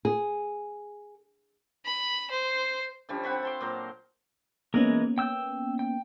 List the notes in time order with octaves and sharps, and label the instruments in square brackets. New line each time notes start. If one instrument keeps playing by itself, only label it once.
[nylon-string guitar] G#4
[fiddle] B5
C5
[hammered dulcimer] D3 F3 G3 C#4
C4 F#5 B5 C#6
A5 C6 D6
A#2 F#3 C5 A#5
[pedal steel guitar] E3 G#3 A#4 [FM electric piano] A#3 B3 C#4
[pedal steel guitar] G5 E6 G6
G5